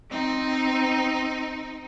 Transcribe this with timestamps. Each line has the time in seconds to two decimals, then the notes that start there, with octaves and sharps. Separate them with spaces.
0.10 C4 D#4